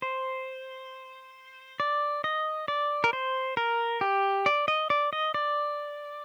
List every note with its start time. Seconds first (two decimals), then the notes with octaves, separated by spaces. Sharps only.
0.02 C5
1.80 D5
2.24 D#5
2.68 D5
3.04 A#4
3.13 C5
3.57 A#4
4.01 G4
4.46 D5
4.68 D#5
4.90 D5
5.13 D#5
5.34 D5